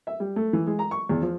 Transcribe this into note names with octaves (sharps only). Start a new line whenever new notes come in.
E5
G3
A3
E3
G#3
A#5
C#6
E2
F3